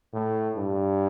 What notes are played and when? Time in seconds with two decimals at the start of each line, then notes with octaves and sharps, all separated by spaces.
0.13 A2
0.56 G2